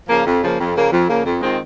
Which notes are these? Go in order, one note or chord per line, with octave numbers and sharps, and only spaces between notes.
C#3 F3 A#3
F2
C#3 F3 A#3
F2
C#3 F3 A#3
F2
C#3 F3 A#3
F2
D#3 G#3 C4 F4